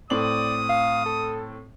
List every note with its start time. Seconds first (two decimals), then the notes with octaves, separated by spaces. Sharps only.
0.10 A2 C4 D5 D#6 F#7
0.69 F5
1.05 A4